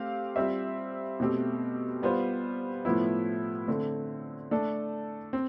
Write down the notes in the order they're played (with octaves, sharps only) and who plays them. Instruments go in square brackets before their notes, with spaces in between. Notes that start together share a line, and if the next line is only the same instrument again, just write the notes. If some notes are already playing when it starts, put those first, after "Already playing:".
Already playing: [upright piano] A3 C4 G4 F5
G3 C4 F4 C5 E5
B2 A3 C4 G4
G3 B3 F4 C5
A2 F3 B3 E4
D3 A3 C4
A3 D4 A4
C4